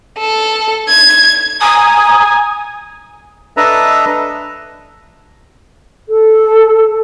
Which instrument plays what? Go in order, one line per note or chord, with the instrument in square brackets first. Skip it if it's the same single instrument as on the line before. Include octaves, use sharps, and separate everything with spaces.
[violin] A4
G#6
[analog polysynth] G#5 [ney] A#5 [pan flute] D#6
[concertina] D4 A4 B4 D#5 E5 A#5
[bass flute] A4